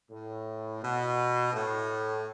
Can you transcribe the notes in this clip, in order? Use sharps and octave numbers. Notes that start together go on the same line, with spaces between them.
A2
B2
A2